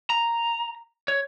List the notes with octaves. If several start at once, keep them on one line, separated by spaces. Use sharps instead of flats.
A#5
C#5